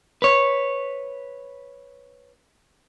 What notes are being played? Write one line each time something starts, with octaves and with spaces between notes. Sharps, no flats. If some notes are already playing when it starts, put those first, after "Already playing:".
B4 C#5